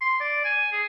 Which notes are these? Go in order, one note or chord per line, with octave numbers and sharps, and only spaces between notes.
C6
D5
G#5
G#4